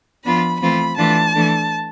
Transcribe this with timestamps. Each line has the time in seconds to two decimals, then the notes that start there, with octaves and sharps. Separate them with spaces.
0.25 F3 B3 D4 F4 B5
0.61 E3 A3 C4 F4 B5
0.97 E3 A3 D4 F4 A5
1.35 E3 A3 D4